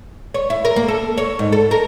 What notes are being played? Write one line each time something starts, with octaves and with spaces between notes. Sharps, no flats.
C#5
E4
A#4
A#3
A4
C#5
G#2
A4
A#4